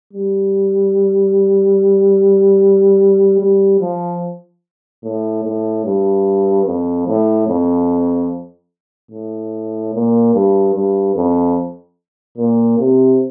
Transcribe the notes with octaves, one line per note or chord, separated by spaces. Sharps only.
G3
G3
F3
A2
A2
G2
F2
A2
F2
A2
A#2
G2
G2
F2
A#2
C3